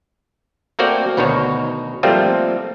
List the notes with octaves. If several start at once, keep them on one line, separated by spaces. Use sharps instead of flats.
A3 A#3 C4 F#4 D5 G5
D2 B2 D#3 D#4 F#4 C#5
F3 G3 A3 A#3 C4 F4